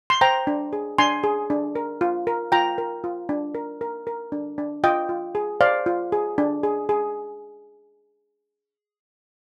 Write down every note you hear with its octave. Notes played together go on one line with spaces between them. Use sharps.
C6
C5 G5 A#5
D4
G#4
D4 G#5 C6
G#4
D4
A#4
F4
A#4
F4 G5 A#5
A#4
F4
D4
A#4
A#4
A#4
D4
D4
F4 D#5 G5
F4
G#4
C5 D5 F5
F4
G#4
D4
G#4
G#4